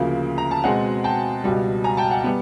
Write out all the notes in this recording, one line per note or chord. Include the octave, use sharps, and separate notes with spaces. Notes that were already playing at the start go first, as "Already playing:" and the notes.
Already playing: D2 C#3 F3 A#3
A#5
A5
B2 G#3 C4 F#5 G#5
G5 A5
C#2 B2 G3
G#5 A#5
G5 A5
F#5 G#5
G3 B3